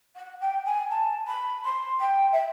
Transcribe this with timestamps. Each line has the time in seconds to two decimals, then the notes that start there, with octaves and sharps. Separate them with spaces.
0.16 F#5
0.41 G5
0.65 G#5
0.90 A5
1.27 B5
1.64 C6
2.00 G5
2.32 E5